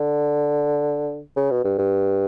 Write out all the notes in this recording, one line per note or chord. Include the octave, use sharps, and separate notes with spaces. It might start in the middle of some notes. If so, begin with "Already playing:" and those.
Already playing: D3
C#3
B2
G2
G2